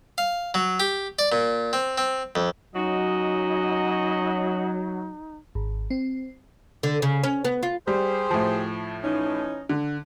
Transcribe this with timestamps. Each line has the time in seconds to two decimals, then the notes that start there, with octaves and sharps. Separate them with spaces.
0.18 F5
0.54 F#3
0.80 G4
1.19 D5
1.32 A#2
1.73 C4
1.98 C4
2.36 F2
2.75 F#3 C#4 D#4 F#4 D#5
5.55 G#1
5.90 C4
6.83 D3
7.02 C#3
7.23 C#4
7.45 B3
7.63 F4
7.88 G3 G4 G#4 C5
8.31 A2 F3
9.04 E3 C#4 D#4
9.69 D3